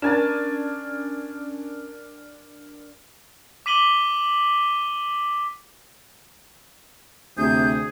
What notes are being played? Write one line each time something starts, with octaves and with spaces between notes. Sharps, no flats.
C#4 D4 A#4 G#5 A5
D6 B6 D#7 F#7 G7
D2 C3 G#4 G6